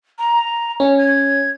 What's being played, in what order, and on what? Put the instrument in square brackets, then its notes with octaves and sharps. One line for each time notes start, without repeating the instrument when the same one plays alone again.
[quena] A#5
[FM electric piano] C#4 [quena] C#5
[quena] G#6